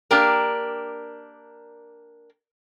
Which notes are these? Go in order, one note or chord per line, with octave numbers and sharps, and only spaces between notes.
A#3 D4 G4 A#4